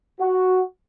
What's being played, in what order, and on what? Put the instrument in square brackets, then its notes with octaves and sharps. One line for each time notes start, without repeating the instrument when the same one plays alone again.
[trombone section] F#4